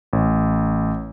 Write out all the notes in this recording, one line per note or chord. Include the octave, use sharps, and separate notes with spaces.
A1